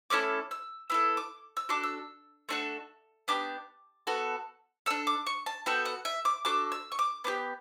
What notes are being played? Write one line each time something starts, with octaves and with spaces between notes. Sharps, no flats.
A3 C#4 E4 A4 D6
E6
B3 E4 A4 E6
D6
E6
D4 F#4 A4 D6
E6
A3 D4 F#4 A4
B3 D4 G4 D6
B3 F#4 A4
D4 A4 E6
D6
C#6
A5
B3 F#4 A4 G5
F#5
E5
D6
D4 F#4 A4 D6
E6
C#6
D6
B3 D4 G4 D6